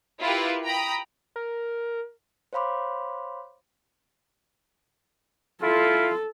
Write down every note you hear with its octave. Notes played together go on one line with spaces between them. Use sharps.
E4 F4 G4 A#4 B4
G5 A#5 B5 D#6
A#4
C5 C#5 F5 B5 C6 D6
E4 F4 A4